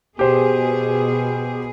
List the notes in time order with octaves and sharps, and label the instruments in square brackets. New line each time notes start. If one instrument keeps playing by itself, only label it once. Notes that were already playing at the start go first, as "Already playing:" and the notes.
[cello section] B2 G#4 [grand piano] G4 C5